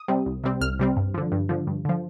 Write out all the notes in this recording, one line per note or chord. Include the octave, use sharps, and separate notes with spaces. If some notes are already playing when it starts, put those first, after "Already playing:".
Already playing: D#6
C3 G3 C4
C2
C3 G3 C4
C2 F6
C3 G3 C4
G2
D3 F3
G2
D3 F3
G2
D3 F3